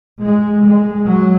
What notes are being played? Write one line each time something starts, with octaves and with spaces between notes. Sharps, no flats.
G#3
G#3
F#3